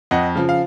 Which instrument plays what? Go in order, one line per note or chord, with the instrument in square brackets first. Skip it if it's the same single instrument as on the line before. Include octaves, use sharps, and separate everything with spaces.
[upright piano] F2 D#5 F#5
C#3 F3
F5